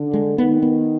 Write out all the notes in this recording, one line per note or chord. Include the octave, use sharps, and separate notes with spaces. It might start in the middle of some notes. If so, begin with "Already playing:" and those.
Already playing: D3
G#3
D#3 B3
B3